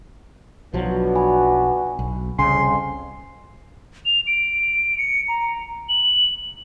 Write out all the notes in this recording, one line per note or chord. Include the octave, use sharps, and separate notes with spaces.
B1 F3 F#3 B3 D4 F#4
G#5 B5
B1
C2 F2 C#3 G#5 C6
F7
D7
C#7
A#5
F#7